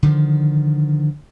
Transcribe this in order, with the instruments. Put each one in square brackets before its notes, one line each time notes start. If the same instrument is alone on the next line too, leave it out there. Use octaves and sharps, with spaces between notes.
[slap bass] D3 D#3 F3